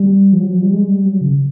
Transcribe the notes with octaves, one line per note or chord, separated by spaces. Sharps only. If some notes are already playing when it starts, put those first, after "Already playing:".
Already playing: G3
F3
F#3
F3
G3
G#3
G3
F#3
C#3